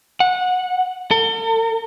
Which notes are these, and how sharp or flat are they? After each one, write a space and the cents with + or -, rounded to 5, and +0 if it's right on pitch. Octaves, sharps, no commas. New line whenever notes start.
F#5 -20
A4 +40